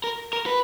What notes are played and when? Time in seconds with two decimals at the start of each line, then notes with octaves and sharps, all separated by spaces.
0.04 A#4
0.33 A#4
0.46 B4